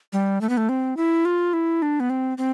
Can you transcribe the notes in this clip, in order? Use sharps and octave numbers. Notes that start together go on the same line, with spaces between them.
G3
A3
B3
A3
C4
E4
F4
E4
D4
B3
C4
C4